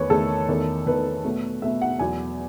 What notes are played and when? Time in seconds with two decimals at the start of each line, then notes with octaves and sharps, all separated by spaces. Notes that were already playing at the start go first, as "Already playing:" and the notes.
Already playing: E2 D#3 A3 B4 C#5
0.10 E2 D#3 A3 A4
0.48 E2 D#3 A3
0.86 E2 D#3 A3 B4
1.25 B2 A3
1.62 B2 A3 E5
1.82 F#5
1.99 E2 B2 F#3 G#5